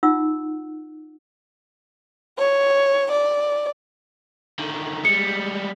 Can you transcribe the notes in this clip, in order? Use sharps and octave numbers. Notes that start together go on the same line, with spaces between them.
D#4 F4 F#5 E6
C#5
D5
D3 D#3
G3 G#3 C#7